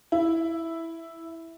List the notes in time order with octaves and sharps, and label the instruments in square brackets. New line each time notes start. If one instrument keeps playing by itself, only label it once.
[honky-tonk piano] E4